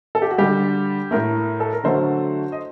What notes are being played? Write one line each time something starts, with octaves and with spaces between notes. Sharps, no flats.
A4
G4
F#4
D3 G3 G4
A2 A3 A#4
A4
A#4
D3 F#3 A3 C5
D#5